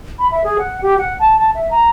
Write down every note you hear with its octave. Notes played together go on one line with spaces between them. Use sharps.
B5
E5
G#4
F#5
G4
F#5
A5
A5
E5
A#5